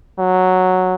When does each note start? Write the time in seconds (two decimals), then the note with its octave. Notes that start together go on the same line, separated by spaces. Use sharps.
0.19 F#3